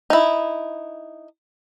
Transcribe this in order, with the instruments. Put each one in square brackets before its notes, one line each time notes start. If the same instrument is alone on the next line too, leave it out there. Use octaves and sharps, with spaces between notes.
[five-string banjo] D#4 E4